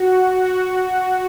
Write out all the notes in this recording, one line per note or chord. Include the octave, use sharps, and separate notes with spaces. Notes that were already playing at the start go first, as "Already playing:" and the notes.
Already playing: F#4
F#4